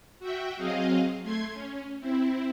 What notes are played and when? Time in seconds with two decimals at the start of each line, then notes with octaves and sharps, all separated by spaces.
0.19 F#4 E5 G5
0.57 F#3 C4 G#4 D#5 F5
1.22 A3 C6 G#6
1.53 C#4
2.00 C4 E4